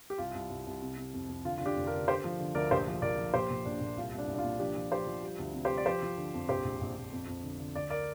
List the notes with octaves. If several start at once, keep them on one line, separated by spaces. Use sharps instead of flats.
G4
C2 F4
C2
C2
C2
C3
C3
F2
F2
D3 F4
D3 F4
D4 G4
F1
F4 A#4
D3
D3 G4 C5
F3
D3
D2 A#4 D5
A#1 G4 C5
F3
A#1 A#4 D5
F3
A#2 G4 C5
A#2
A#1 D4
A#2
C2 F4
C2
D4
C2
D4
F4
A#2
F3 D4 G4
F3
F3 G4 C5
F3
G3
D2
C3
G4 C5
G3
D5
F3 G4 C5
F3
D3
F2
A#1 G4 C5
A#1
A#1
A#1
F2
F2
D3
D3
D2 D5
A#4 D5